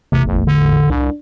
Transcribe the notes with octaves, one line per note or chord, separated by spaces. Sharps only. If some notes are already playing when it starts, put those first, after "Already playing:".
A1 E2 A2 C3
F#1
D3
C2 D4